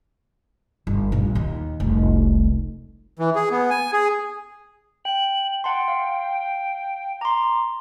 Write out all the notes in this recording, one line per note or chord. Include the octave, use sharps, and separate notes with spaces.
G1
A#1 G2
D#2
F1 C2
E3
G#4
B3
G#5
G#4
G5 F#7
F#5 G5 A5 C6
F5
A#5 C6 D6